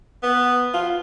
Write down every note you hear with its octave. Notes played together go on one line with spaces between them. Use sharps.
B3
F4